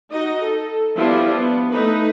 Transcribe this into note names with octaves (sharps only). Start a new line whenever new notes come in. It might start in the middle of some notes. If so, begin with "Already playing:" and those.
D#4 F#4 D#5
A4
F3 G3 B3 D4 E4 F4
B3
A3 D#4 B4